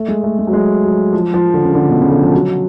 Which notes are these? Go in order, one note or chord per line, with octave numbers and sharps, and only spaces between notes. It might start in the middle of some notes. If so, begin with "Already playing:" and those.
Already playing: A3
G#3
A3
G#3
F#3
G#3
F#3
F3
F3
D3
C#3
D3
B2
C#3
D3
F3
F#3